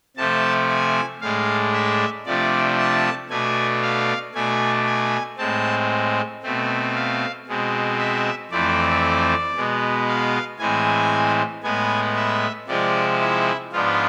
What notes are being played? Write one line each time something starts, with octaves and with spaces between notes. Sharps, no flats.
C3 F3 A3 C4 A5
G#5
A2 G#3 D4 F5
E5
C3 F3 A3 D4 D5
A5
B2 A3 D4 G#5
F5
B2 A3 D4 G#5
G#5
A2 G#3 C4 A5
B2 A3 C4
F5
B2 G#3 C4
E5
F2 E3 A3 C4 D5
B2 G#3 B3
F5
A2 E3 G#3 C4 G#5
A2 G#3 B3 G#5
E5
C3 F3 G#3 C4 D5
E4
G#2 F3 B3 D4 F4